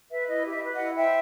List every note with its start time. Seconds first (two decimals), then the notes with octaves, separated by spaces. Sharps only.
0.11 B4 E5
0.27 E4 D#5
0.45 G4
0.51 E5
0.63 B4
0.74 D#5 F#5
0.80 E4
0.97 C5 E5 G5